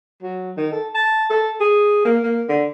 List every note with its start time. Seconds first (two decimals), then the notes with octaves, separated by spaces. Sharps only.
0.23 F#3
0.57 D#3
0.73 A4
0.95 A5
1.30 A4
1.60 G#4
2.05 A#3
2.23 A#3
2.49 D3